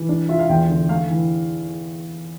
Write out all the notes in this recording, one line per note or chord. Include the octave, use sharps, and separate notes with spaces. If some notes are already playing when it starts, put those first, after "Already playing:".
Already playing: E3
D4
F4 E5
F5
E2 G5
D3
A3 F5
E3